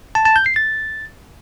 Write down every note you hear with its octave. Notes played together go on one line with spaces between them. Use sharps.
A5
A5
G6
C7
A6